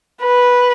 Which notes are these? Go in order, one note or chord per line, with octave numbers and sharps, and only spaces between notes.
B4